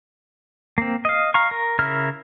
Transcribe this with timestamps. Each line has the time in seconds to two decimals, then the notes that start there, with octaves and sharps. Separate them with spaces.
0.78 A#3 C4
1.05 D#5 F5
1.34 F5 A#5 C#6
1.51 A#4
1.79 C#3 E4 A#4 F6